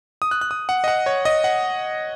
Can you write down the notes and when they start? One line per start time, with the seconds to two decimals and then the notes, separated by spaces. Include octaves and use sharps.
0.22 D#6
0.31 F#6
0.41 F#6
0.51 D#6
0.69 F#5
0.84 D#5
0.88 F#5
1.06 C#5
1.25 D#5
1.44 F#5